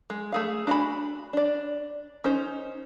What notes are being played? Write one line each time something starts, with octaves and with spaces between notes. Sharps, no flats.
G#3
A3 G#4 F5
D4 F#4 D5 G#5 B5
D4 D5
C#4 D#4 C5